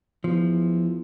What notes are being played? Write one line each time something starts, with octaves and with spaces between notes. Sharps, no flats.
E2 F3